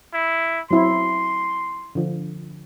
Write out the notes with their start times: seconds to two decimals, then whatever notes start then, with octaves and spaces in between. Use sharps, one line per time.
0.13 E4
0.71 F#3 C4 E4 C6
1.95 D3 F3